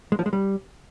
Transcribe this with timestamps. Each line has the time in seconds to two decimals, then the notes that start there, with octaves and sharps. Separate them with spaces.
0.12 G#3
0.19 F3
0.26 G#3
0.33 G3